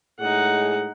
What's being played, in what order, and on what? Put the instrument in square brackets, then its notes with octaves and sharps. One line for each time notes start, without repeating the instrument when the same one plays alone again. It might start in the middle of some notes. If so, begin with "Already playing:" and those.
[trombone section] A2 G#3 G#4 [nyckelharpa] D#4 F#5